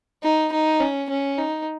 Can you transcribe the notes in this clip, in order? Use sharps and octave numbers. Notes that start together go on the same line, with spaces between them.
D#4
D#4
C#4
C#4
D#4